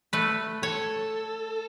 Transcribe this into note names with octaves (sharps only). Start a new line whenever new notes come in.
A3 B4
A4 C#5